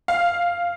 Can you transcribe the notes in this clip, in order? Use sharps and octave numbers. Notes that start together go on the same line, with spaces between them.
F5